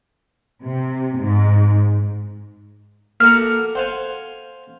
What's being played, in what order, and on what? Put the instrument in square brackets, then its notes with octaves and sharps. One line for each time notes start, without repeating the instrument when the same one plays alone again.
[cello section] C3
G#2
[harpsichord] A#3 F#4 F5 [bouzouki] A4 A#5 [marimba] F6
[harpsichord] C5 F5 G#5 [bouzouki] F#5